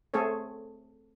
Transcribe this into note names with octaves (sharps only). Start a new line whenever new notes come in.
A3 C4 G#4 A4 C#5